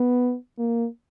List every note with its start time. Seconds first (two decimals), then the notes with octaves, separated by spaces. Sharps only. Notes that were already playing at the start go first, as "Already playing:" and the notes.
Already playing: B3
0.59 A#3